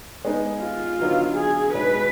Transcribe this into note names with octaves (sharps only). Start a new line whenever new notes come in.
G#3 B3 D#4 G#4
F4
D3 F#3 B3 D#4
G#4
B2 G#3 D#4 B4